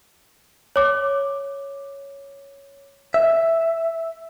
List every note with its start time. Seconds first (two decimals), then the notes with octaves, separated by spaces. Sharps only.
0.76 C#5 D6
3.14 E5